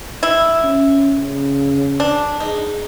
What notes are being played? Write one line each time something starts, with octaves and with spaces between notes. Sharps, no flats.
E4
C#4
C#3
D4
D#4 G#4